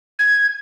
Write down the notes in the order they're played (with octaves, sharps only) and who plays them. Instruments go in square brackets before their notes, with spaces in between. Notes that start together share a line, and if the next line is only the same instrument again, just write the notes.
[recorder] G#6